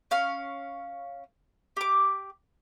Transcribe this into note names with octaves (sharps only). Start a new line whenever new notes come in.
C#4 F5 F6
G4 D6